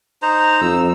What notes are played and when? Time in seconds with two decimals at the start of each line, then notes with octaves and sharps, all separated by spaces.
0.22 D#4 C5 A#5
0.61 F2 E6